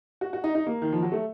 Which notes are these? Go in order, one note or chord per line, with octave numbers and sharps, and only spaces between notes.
F#4
F#4
D#4
D#4
A#3
D#3
F3
F#3
A3